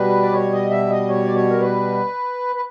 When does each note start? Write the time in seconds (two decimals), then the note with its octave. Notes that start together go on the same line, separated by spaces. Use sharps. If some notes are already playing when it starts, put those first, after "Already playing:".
Already playing: B2 G3 B4
0.22 D5
0.33 C#5
0.52 D#5
0.71 E5
0.90 D#5
1.09 C#5
1.25 D5
1.35 C#5
1.50 A#4
1.60 B4
2.56 B4